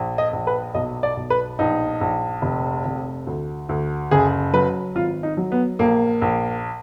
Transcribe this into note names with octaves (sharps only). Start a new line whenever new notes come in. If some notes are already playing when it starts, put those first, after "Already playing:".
Already playing: A#1
D#5
A#1
B4
B1 D#5
D5
B1
B4
A#1 D#4
A#1
F1
F1
D2
D2
F#1 G#4
F#3 B4
G#1 F4
D#4
F#3
B3
A#1 A#3
A#1